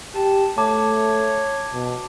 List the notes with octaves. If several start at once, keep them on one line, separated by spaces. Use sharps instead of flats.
G4 A5
A3 C#5 A5 D6
B2